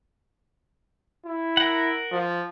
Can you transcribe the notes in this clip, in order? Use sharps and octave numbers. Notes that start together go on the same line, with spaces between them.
E4
A#4 F#5
F3